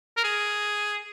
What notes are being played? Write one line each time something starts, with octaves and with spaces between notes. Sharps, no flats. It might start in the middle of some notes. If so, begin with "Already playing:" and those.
A#4
G#4